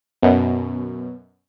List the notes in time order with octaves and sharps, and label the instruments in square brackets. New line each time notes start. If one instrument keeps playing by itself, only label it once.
[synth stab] F#2 B2 [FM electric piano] B3